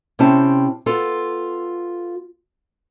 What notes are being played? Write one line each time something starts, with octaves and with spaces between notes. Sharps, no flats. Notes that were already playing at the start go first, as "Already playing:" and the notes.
C3 C4 C#4 E4 A5
B3 F4 A4